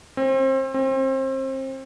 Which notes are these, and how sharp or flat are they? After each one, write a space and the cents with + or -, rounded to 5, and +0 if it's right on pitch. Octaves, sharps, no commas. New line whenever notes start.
C4 +30
C4 +30